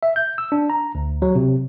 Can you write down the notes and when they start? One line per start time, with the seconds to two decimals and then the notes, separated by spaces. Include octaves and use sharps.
0.03 E5
0.16 G6
0.38 E6
0.52 D4
0.70 A#5
0.95 D2
1.22 F#3
1.35 C3